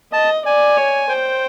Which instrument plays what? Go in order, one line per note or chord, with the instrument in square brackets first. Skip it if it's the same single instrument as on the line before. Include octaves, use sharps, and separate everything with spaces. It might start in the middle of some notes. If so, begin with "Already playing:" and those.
[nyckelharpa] D#5 [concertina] A5
[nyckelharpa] D5 [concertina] G#5
[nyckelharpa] C#5
[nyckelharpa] C5 [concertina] G5